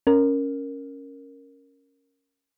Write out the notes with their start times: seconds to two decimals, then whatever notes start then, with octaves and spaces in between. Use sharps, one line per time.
0.07 C#4 A#4